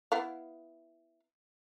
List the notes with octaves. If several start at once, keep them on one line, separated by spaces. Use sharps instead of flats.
B3 E4 F5